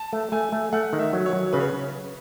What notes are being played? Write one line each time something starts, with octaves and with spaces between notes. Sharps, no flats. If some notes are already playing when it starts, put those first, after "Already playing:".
Already playing: A5
A3
A3 G#5
A3
A3 F#5
D#3
E5
F#3
C#5
F#3
C#3 B4
C#5